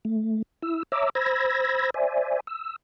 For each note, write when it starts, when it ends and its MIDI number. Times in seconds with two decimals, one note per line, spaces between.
0.05 0.42 57
0.62 0.83 64
0.62 0.83 88
0.92 1.10 73
0.92 1.10 76
0.92 1.10 82
0.92 1.10 86
0.92 1.10 88
1.15 1.90 72
1.15 1.90 83
1.15 1.90 88
1.15 1.90 92
1.15 1.90 94
1.94 2.40 72
1.94 2.40 74
1.94 2.40 76
1.94 2.40 80
2.47 2.76 88